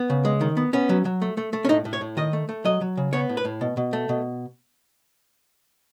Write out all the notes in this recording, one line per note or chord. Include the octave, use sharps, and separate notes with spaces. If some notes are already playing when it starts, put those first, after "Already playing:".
Already playing: B3
C#3
G#3
D#3
B3
B3 C#4
F#3
F#3
A3
A3
A3
C#4
A2 D#4
A2
C#5
A2
D#3 D#5
A3
A3
F#3 D#5
F#3
C#3
B3 C#5
A2
B4
A2
B2
B2
A3
B2